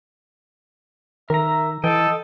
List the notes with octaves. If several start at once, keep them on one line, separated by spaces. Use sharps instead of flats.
D#3 A#4 E5 A#5
E3 A4 D#5 G5